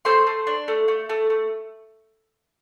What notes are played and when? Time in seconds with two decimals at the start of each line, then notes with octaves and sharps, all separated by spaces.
0.05 A3 C5 C6
0.27 A3
0.47 D4
0.68 A3
0.88 A3
1.09 A3
1.30 A3